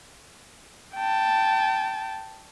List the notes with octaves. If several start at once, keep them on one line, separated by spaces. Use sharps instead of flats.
G5 A5